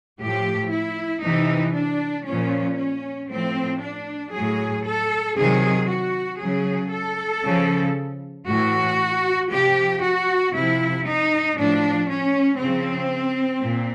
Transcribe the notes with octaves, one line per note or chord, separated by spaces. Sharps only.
A2 F3 G4
E4
C3 E3 D#4
D4
A#2 F3 C#4
C#4
A2 F3 C4
D4
A2 F#3 G#4
A4
C3 D#3 F#3 G#4
F#4
C#3 F#3 G#4
A4
C#3 F3
A2 E3 F#4
C3 F3 G4
F#4
C3 F3 E4
D#4
A2 F3 D4
C#4
C#3 F3 C4
A#2